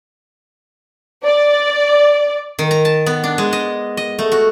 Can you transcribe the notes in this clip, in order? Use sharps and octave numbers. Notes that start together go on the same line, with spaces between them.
D5
D#3
A#5
A5
B3
D4
G#3
D#5
D#5
A3
F#4